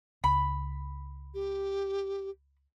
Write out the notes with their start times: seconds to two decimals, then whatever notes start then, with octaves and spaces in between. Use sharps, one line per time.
0.24 C#2 B5
1.34 G4